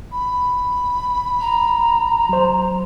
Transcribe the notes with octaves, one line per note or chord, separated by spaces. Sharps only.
B5
A#5
F#3 C5